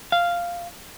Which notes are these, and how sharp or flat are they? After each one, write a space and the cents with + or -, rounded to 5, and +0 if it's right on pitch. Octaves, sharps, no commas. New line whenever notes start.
F5 -5